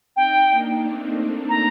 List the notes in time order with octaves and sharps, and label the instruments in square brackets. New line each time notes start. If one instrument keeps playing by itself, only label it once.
[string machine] C4 D#4 [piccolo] G5
[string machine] A#3 D4
A3 C4
[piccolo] A#5